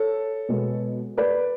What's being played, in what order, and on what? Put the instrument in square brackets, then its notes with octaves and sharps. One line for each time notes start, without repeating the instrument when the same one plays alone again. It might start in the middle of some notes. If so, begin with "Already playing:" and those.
Already playing: [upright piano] A4 C#5
B2 G#3 B3
B4 D5